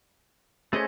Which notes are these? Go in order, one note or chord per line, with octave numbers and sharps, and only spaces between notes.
A3 C#4 G#4 C5 D#5